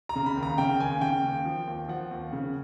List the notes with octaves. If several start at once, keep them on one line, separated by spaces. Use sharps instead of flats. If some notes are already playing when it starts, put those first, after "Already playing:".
A#5
C#3
B5
D#2
A#5
C#3 G5
D#2 G#5
C#3 G5
D#2
F3
D#2
F3 F#5
D#2
C#3